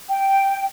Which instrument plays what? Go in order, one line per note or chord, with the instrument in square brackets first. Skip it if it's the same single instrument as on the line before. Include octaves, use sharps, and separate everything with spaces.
[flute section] G5